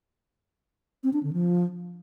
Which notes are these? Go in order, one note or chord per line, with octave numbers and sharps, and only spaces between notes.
C4
D4
D3
F3